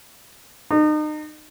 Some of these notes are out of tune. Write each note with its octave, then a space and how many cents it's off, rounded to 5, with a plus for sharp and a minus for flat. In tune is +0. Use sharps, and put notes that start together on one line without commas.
D#4 -35